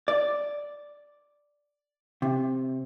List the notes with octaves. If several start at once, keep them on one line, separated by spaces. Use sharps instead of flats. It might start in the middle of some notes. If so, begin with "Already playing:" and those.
D5
C3